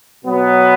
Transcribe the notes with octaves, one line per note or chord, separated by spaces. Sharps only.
B2 F#3 B3